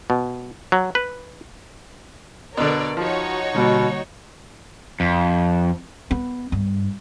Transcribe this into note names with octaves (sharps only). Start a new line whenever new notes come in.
B2
F#3
B4
B2 D3 A#4 B4 C#5 D5
F3 D#4 F#4 C#5
B2 D3 G3 A#3
F2
B3
G2